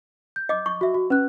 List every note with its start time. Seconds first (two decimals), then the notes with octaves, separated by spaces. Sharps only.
0.36 G6
0.49 D#5 D6
0.66 C#6
0.81 F#4 E5
0.94 F#4
1.10 C#4 B4 F#6